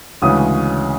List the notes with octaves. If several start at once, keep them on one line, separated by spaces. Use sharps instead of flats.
D2 C#3 E3 G#3 C#4 D#6